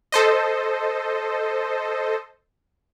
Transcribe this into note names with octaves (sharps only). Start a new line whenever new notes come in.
A4 C5 D#5